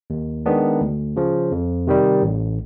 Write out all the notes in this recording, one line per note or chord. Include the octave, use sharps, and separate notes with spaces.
D#2
D#3 G#3 B3 D4
D2
C#3 F3
F2
C3 D#3 G3
A1